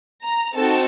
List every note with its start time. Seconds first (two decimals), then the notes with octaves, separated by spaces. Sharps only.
0.23 A#5
0.56 C4 D#4 F#4 A4 A5